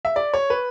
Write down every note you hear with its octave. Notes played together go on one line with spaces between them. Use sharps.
E5
D5
C#5
B4